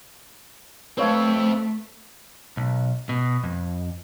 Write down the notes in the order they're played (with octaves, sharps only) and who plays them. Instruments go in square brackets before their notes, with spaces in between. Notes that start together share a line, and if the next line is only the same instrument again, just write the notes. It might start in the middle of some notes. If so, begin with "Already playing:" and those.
[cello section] A3 [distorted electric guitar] C4 A4 [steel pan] B4 C#5 F5
[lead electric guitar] B1
B2
F2